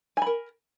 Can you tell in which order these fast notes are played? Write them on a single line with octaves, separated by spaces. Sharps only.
G#5 B5 A#4